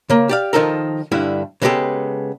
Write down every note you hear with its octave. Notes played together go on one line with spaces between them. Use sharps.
C#3 A#3
G4 D5 F5
D#3 F3 D#4 A4 A#4
G2 D3 G3 E4
C#3 G#3 B3 C#4 G4 A4